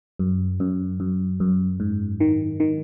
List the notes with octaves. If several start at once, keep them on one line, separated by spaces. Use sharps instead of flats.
F#2
F#2
F#2
F#2
G#2
D#3
D#3